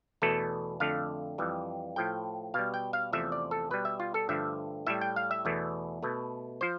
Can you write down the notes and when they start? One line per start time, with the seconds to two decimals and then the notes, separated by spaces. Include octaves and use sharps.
0.22 E2 B2 A3 A4
0.80 F2 D3 A3 F5
1.38 F2 E3 G3
1.96 A2 F3 A3 G5
2.54 B2 G3 F5
2.74 G5
2.93 F5
3.13 E2 C3 F3 A3 E5
3.32 D5
3.51 A4
3.70 B2 G3 B4
3.85 E5
4.00 F4
4.14 A4
4.29 G2 D3 F3 A3 E5
4.87 A2 G3 E5
5.02 G5
5.16 F5
5.31 E5
5.45 E2 B2 A3
6.03 B2 A3
6.61 F3 C5